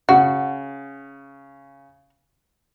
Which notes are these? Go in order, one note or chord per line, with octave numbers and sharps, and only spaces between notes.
C#3 F#4